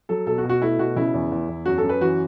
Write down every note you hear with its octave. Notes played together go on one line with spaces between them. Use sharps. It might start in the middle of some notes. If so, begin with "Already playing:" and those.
F#3 A4
B2 A4
F#4
B2
F#4
A3 E4
B2 F#4
C#3 E4
E2
E2
E2
F#2 F#4
A4
F#2
B4
E3 F#4